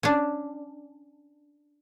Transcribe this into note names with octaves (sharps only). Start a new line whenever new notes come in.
C#4 D4